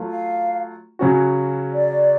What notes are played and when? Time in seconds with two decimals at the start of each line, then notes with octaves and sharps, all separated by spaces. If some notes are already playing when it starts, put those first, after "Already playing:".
Already playing: F#3 A3 F4
0.08 F5
0.99 C#3 F#3 C#4 F#4
1.73 D5